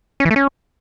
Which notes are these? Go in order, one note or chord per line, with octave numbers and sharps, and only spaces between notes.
C#4
E3
A3
C#4